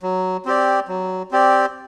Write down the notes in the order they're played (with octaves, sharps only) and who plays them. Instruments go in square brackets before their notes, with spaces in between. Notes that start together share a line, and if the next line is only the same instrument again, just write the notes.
[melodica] F#3
C4 G4 D5
F#3
C4 G4 D5